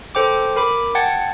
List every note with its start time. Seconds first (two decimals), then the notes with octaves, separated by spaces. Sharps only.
0.15 A4 C5 G5 D6
0.56 A#4 B5 D6
0.95 F#5 G5 A5 G#6 A6 C#7